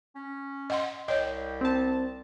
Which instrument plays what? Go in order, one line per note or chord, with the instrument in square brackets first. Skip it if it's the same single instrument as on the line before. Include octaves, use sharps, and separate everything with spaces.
[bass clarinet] C#4
[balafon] D#5 F#5 C6
[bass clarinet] C2 [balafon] C#5 D#5 [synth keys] G5
[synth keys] C4 A5